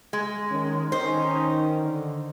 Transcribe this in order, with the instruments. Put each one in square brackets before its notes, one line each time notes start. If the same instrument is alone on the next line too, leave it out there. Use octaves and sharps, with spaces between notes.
[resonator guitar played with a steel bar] G#3
[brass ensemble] D#3 [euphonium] C#4
[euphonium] D#3 [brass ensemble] C#4 D#4 [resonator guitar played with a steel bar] C5
[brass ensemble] D3